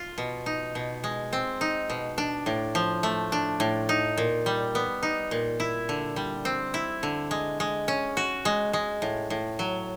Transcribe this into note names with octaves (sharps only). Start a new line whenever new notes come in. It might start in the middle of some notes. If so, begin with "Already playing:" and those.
Already playing: F4
B2
D#4
B2
G#3
C4
D#4
B2
D4
A2
F3
A3
D4
A2
D#4
A#2
G3
B3
D#4
A#2
E4
D3
G3
C4
E4
D3
G#3
G#3
C#4
F#4
G#3
G#3
A2
A2
F#3